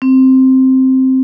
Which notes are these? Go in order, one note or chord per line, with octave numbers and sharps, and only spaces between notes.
C4